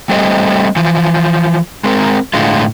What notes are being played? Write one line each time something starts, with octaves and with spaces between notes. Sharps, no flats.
G3 A3 C4 D#5
E3 F3
G#3 C4 A#4
A2 D3 G#3 F4